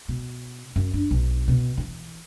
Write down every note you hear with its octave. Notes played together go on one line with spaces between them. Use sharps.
B2
F#2
D4
B1
B2
E3